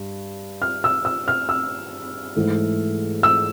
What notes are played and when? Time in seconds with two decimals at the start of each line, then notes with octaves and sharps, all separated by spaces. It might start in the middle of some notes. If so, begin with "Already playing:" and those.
Already playing: G2
0.62 F6
0.84 E6
1.05 E6
1.28 F6
1.49 E6
2.36 G#2 E3 A3
3.23 E6